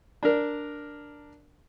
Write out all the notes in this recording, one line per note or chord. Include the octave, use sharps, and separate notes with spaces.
D4 A#4